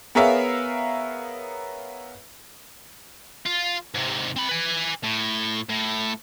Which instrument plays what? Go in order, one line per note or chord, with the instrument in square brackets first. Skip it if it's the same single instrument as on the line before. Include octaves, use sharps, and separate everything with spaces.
[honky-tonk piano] B3 G#4 A#4 C#5 E5 F5
[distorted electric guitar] F4
G#2 C3
C4 B5
B4 G#5
A2
A2